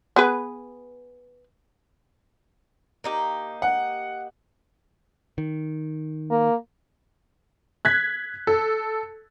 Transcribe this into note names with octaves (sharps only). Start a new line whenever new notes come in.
B3 G#4 B4
A#3 D#4 G4
F#5
D#3
A#3
F#6 G#6 B6
A4